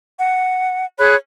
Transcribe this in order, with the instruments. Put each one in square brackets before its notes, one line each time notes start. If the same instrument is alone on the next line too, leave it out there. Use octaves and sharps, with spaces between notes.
[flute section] F#5
G#4 C#5 B5 F#6